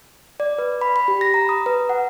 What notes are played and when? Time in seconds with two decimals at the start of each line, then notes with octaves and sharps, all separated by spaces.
0.40 D5
0.58 B4
0.81 B5
0.96 B5
1.08 G4
1.21 A#6
1.34 A#5
1.49 D#6
1.66 B4
1.89 F#5